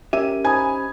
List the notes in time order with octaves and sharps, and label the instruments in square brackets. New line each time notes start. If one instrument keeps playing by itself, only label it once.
[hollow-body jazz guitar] C#4 G4 E5 [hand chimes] A#4 [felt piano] D#7
[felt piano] D#4 G#5 G#6 [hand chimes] C5 B5 D#6